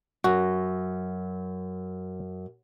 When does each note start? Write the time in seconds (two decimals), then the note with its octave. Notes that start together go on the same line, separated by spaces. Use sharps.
0.24 F#2 F#4